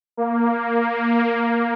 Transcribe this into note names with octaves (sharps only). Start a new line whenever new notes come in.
A#3